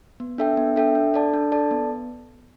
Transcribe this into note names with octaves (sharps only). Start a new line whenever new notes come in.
B3
D4 A4 E5 G5
B3
D4 A4 E5 G5
D4
A4 D5 A5
D4
A4 D5 A5
B3